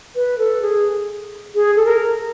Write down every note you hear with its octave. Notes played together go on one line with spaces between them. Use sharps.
B4
A4
G#4
G#4
A4
A#4